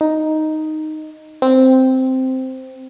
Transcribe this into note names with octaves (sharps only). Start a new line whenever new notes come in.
D#4
C4